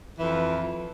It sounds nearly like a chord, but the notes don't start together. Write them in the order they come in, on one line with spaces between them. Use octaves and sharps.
E3 F2 F3